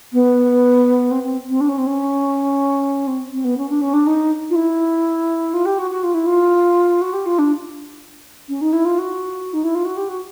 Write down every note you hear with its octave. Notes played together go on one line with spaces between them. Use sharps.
B3
C4
C4
C4
D4
C#4
C4
C#4
C4
C4
B3
C#4
D4
C#4
D4
D#4
F4
E4
F4
G4
F#4
F#4
F4
E4
F4
F#4
G4
F4
D4
C#4
D#4
E4
F4
F#4
D#4
E4
F4
F#4
G4
F#4